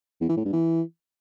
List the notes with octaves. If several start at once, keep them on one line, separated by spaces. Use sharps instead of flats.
E2
E3
A2
G2
E3